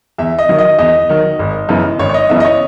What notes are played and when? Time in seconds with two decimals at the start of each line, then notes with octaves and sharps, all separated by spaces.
0.18 E2 E5
0.39 D#5
0.49 D#3 F#3
0.58 D#5
0.79 E2 D#5
1.09 D#3 F#3
1.39 G#1
1.69 F#2 C#3 E3 B3
1.99 G#1 C#5
2.09 C#5
2.14 D#5
2.29 F#2 C#3 E3 B3 E5
2.40 D#5
2.45 C#5